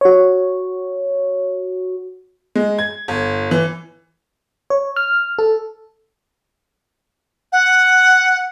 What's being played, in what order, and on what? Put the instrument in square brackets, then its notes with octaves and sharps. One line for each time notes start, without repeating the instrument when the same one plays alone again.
[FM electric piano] F#4 C#5
[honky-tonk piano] G#3
G#6
G1
E3
[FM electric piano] C#5
F6
A4
[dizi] F#5